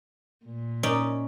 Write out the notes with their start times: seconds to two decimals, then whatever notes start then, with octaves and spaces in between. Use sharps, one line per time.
0.45 A#2
0.83 C#4 D#4 D5